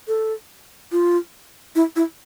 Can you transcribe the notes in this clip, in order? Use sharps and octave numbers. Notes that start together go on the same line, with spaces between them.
A4
F4
E4
E4